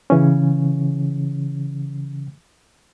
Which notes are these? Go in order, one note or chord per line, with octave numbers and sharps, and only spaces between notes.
C#3 E3 C#4